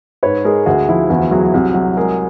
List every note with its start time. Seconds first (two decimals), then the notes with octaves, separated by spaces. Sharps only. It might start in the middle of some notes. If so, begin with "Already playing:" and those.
0.23 G#2 B4 C#5
0.45 G#3 G#4 A#4
0.66 D2 F#4 G#4
0.89 F3 E4 F#4
1.10 E2 E4 F#4
1.31 F#3 F#4 G#4
1.54 C2
1.74 F#3
1.97 G#3 G#4 A#4